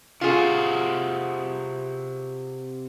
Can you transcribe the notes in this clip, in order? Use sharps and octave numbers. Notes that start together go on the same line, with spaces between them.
C3 F4 F#4 G#4